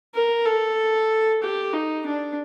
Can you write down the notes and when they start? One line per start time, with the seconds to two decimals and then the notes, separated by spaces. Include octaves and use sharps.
0.14 A#4
0.46 A4
1.42 G4
1.74 D#4
2.06 D4